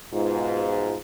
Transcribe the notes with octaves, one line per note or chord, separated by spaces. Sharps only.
G#2 B2 F4